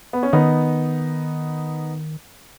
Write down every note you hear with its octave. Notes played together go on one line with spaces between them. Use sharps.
B3
C#4
D#3 B3 D#4